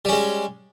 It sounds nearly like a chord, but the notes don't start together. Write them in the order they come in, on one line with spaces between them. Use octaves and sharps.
G3 C#4 G#3